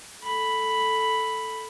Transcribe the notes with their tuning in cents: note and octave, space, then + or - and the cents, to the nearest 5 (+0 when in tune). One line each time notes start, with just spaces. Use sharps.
A4 +0 B5 +0